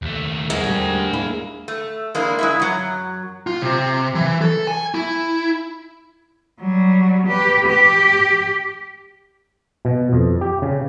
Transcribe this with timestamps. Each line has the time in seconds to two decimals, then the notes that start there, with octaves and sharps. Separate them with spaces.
0.02 D#2 A3
0.50 G#3 A#4 F#5
0.64 D2 G3
1.13 A#3 E4
1.68 A3
2.15 G#3 A#3 D4 E4
2.39 G#3 E4 E5
2.60 F#2 F#3
3.47 F4
3.62 C3
4.15 E3
4.41 A4
4.67 G#5
4.94 E4
6.60 F#3 G3
7.28 G4 B4
7.67 G4
9.85 B2
10.13 F2
10.41 G4
10.62 C#3